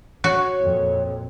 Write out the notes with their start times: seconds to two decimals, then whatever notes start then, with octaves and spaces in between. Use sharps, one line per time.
0.24 F#4 C#5
0.61 F2 A#2